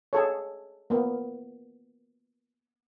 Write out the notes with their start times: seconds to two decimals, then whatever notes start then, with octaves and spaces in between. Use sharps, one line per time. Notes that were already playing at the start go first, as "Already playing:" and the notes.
0.13 G#4 A4 C#5
0.90 A#3 B3